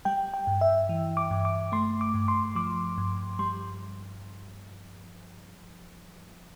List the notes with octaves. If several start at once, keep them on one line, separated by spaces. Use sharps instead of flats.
G3 G5
G5
G2
E5
E3
D6
G2
D6
A3 C6
D6
G2
C6
F3 D6
G2
G3 C6